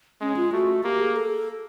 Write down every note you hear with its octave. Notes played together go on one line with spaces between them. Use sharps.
G#3 C#4
F4
A3 F#4
A#3 G4
G#4
A4